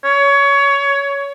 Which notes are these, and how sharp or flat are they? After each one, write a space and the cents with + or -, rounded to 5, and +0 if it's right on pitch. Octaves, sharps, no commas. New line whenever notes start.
C#5 +20